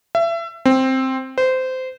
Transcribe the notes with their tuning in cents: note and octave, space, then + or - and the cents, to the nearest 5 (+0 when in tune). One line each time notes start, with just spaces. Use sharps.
E5 +30
C4 +5
C5 -20